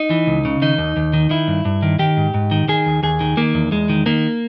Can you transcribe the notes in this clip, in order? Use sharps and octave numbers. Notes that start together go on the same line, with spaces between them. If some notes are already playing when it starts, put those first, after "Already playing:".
Already playing: D#4
E3
C#2
C#3
D#3 D#4
D#2
D#2
D#3
D#3 E4
G2
G2
D#3
D#3 G4
G#2
G#2
D#3
D#3 G#4
D#2
D#2 G#4
D#3
D#3 A#3
E2
E2 G#3
D#3
D#3 A#3